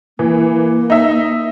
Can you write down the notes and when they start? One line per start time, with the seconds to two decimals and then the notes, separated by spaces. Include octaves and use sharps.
0.19 E3 A#3
0.90 D#4 E5